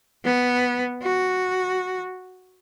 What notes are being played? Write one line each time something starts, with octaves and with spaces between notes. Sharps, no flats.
B3
F#4